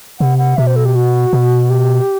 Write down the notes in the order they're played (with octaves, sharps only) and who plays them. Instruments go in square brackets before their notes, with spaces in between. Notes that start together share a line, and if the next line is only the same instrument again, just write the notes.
[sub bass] C3 [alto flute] F#5
[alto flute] F#5
[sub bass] B2 [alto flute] E5
[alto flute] C5
A4
G4
F#4
[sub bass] B2
[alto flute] G4